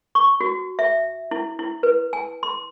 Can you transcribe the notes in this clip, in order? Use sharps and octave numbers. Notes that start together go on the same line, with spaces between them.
C#6
F#4
E5
E4
E4
B4
G#5
C6